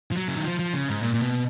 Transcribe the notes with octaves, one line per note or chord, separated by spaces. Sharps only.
F3
F#3
C#3
D#3
F3
F3
C#3
G#2
A#2
A#2
B2